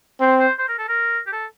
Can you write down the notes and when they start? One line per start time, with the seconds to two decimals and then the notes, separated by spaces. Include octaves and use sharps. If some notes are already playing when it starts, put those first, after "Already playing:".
0.20 C4 C5
0.39 C5
0.58 C5
0.68 A#4
0.79 A4
0.88 A#4
1.27 G4
1.32 A4